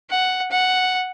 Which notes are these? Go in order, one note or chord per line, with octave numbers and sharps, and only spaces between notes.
F#5
F#5